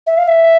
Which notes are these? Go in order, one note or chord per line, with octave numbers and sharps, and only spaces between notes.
E5
F5
E5